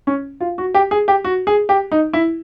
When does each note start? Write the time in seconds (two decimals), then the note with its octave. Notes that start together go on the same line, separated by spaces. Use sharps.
0.07 C#4
0.40 F4
0.58 F#4
0.74 G4
0.91 G#4
1.08 G4
1.24 F#4
1.47 G#4
1.69 G4
1.92 D#4
2.13 E4